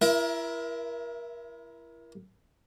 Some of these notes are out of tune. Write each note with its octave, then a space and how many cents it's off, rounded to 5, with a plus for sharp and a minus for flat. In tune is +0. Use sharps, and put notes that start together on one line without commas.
E4 +35 A#4 +30 E5 +0